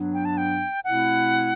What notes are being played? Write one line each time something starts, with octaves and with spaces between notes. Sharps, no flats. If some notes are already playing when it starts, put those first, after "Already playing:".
Already playing: G2 F#3 B3 D4
G5
A5
G5
B2 A3 C4 E4 F#5